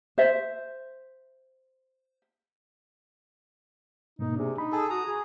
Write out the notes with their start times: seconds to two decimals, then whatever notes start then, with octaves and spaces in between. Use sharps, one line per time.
0.18 C5 E5
4.19 G#2 B2 A#3 D#4
4.36 C3 D4 G#4
4.58 D#4 B5
4.72 G#4 A4
4.90 F#4 A#5 D#6
5.05 G#4